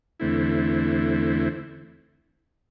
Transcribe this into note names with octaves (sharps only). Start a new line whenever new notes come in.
E2 D3 A3 C4 E4